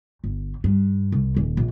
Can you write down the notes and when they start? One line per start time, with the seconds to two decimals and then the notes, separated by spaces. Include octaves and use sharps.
0.24 G1
0.64 G2
1.12 C2
1.37 D#1
1.57 A#1